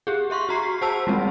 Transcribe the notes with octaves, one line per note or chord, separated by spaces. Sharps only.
G4 G#4
G#4 E5 C6 C#6
F#4 A#5 C7
G#4 C5 A5 E6
G3 G#3 C4